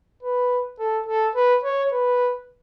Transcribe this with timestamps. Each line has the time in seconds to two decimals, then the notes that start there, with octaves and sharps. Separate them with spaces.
0.23 B4
0.79 A4
1.07 A4
1.35 B4
1.64 C#5
1.92 B4